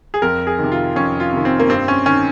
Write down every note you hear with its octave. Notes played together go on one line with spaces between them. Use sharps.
G#4
F2 A#4
G#4
C3 D#3
F4
F2 C#4
F4
C3 D#3
C4
A#3
G2 C4
C#4
D#3 C#4